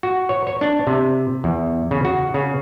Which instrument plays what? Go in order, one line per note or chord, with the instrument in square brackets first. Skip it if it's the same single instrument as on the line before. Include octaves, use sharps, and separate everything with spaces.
[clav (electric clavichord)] F#4
C#5
C#5
D4
C3
E2
C#3
F#4
C#3